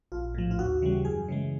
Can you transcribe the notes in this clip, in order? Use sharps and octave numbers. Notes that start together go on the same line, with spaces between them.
A#1 F4
A2 F3
F4
D#2 F#4
C#3 E3 G3
F#2 G#4
C#3 E3 G#3